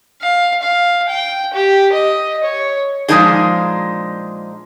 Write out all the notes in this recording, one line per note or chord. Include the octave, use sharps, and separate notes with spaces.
F5
F5
G5
G4
D#5
C#5
A#2 F3 G#3 D4 D#4 G#4